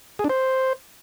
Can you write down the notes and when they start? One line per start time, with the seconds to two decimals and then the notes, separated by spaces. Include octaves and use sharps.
0.19 G#4
0.24 D4
0.30 C5